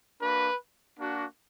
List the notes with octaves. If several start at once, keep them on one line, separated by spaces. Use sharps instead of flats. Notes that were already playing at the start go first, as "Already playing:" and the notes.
A#3 D4 F#4 B4
A#3 D4 F#4